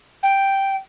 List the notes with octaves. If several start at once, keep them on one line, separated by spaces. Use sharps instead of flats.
G5